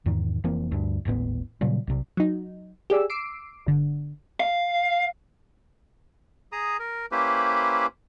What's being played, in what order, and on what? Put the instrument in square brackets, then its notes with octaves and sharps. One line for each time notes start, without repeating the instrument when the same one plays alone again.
[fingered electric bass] E2 G#2 D#3
F1 E3 A#3 C4
D2 G2
D#1 G#1 A2 B3
A#2 C#3 F#3 G3
B1 C3
[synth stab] F#3 D#4
G4 G#4 D5 E6
D6 E6 C7 D7
G1 D3
[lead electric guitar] F5
[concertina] G#4 A#5 D#6
A#4
A#3 C#4 E4 G4 B4 C5